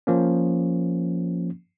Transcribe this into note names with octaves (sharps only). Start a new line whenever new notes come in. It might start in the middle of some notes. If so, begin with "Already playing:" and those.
F3 A#3 C#4